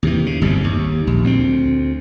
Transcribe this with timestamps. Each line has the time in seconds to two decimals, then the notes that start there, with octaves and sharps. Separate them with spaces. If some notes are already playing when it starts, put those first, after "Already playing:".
0.03 D#2 C3 E3
0.26 C#3
0.41 G1 C2 G2 C3
0.64 D#2
1.07 A#1
1.24 D2 A#3 C4